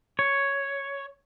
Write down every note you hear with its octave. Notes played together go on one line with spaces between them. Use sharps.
C#5